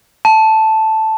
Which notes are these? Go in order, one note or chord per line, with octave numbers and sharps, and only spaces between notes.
A5